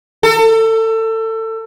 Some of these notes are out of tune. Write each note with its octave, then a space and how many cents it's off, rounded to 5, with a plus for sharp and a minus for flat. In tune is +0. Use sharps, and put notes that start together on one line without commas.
A4 +25